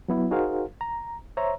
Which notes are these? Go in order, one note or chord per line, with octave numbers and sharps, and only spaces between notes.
F#3 B3 E4
D#4 F#4 G#4 A#4 C5 F5
A#5
C5 C#5 E5 A#5